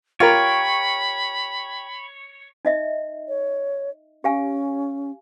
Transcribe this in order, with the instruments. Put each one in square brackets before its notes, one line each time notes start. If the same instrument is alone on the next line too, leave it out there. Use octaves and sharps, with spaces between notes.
[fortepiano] F4 A#4 [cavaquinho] G4 [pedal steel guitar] C#5 [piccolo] B5
[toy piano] D#4 D#5 E5
[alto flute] C#5
[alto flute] C#4 [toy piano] G4 F5 G#5